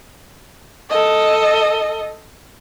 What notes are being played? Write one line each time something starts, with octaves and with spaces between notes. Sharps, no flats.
A4 D#5